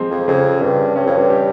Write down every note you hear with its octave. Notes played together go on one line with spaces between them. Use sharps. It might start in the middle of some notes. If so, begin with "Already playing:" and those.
Already playing: F3 G#3 C4
F2
F2 C#3
G2 C#3
G2 C#4
F2
G2
G4